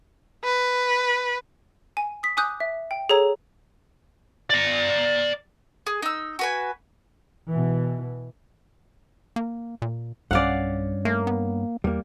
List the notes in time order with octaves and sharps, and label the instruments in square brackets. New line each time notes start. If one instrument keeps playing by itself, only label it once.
[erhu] B4
[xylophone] G#5
D#6 B6
G#5 D6 D#6 F#6 G6
E5
G5
G#4 A4 C#5 A#5
[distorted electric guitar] D5 A#5
[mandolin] G#4
D#4 E6
F#4 B4 G#5
[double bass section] B2 E3
[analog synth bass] A#3
A#2
[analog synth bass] B1 [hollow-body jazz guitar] G2 C#4 [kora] D5 F5 F#5
[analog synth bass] A3 [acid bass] A#3
[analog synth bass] B3
[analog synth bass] E2 [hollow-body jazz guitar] G3 A#3